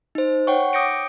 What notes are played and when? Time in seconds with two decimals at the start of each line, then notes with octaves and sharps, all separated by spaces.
0.15 D#4 C5
0.47 C#5 F#5 G5 C#6
0.73 D6 D#6 G6 A#6 C#7 D7